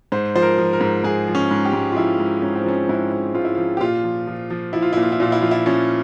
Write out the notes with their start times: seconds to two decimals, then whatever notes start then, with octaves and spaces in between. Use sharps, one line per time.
0.12 G#2 C5
0.35 F3 C5
0.42 A#4
0.58 F3
0.73 A#4
0.81 G#2
1.04 G#2 G#4
1.28 F3
1.35 C#4
1.51 G#2
1.65 G4
1.74 G#2
1.92 F4
1.97 F3 E4
2.20 G#2
2.42 G#2 C#4
2.56 C4
2.65 F3 C#4
2.89 G#2 E4
3.12 G#2
3.34 G#2 F4
3.45 E4
3.55 F3 F4
3.77 G4
3.81 A#2 F4
4.04 F3
4.27 F3
4.50 F3
4.73 F3 E4
4.82 F4
4.93 A#2 E4
5.03 F4
5.12 E4
5.20 A#2 F4
5.32 E4
5.42 F3 F4
5.51 E4
5.66 F3 C#4